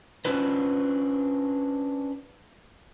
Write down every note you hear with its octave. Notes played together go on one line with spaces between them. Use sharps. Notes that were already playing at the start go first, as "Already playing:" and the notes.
C#4 D4 F4 B4 C5